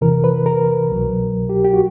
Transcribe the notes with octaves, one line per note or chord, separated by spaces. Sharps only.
E2 C3 E3 A#4
B4
A#4
C2 B2 F#3
G4
G4
F#4